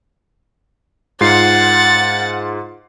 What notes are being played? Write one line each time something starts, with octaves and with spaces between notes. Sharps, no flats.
G#2 F4 F#5 A6 C7